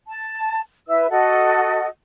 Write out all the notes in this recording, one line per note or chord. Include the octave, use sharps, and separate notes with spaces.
A5
E4 B4 E5 E6
F#4 A4 D#5 F#5